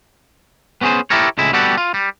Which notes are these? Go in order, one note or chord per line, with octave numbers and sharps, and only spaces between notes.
B3 C#4 G4 G#4 C5
E4 G4 A4 A#4 C#5
C#2 A2 G#3 E4
G3 B3 F#4 G4 A4 F#5
F4
G3